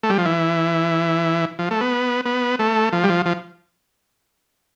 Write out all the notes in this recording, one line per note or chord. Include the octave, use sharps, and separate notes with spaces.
A3
G3
F3
E3
F3
A3
B3
B3
A3
F3
G3
F3
F3